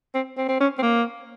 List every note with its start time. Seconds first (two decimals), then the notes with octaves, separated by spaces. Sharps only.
0.14 C4
0.37 C4
0.49 C4
0.60 C#4
0.79 C4
0.82 A#3